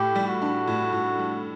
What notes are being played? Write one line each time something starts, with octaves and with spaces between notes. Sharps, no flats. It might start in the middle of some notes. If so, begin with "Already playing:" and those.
Already playing: A2 G4
G3
F#4
D4
A2
A2
G3